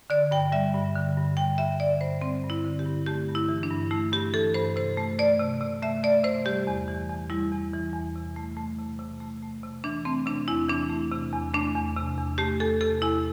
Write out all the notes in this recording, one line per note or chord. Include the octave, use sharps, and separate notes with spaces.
D3 D5
G2 G5
G3 E5
G2
D3
G2
G3 G5
G2 E5
D3 D5
G2 C5
G3 C4
G2
E4
D3
G4
G2
A3 G4
G2
E4
E3
D4
G2
A3 E4
G2 G4
E3 A4
G2 C5
C3 C5
A3
A3 D5
C3
C3
A3 E5
A3 D5
C3 C5
G3 G4
E2
E3
E2
G3 E4
E2
E3
E2
C3
A3
A3
C3
C3
A3
A3
C3
E3 D4
A3 C4
C3 D4
E2 E4
E3 D4
A3
C3
E2
A3 D4
E2
C3
E2
A3 G4
E2 A4
C3 A4
E2 E4